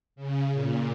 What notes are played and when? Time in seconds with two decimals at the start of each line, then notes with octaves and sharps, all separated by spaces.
0.16 C#3
0.53 A#2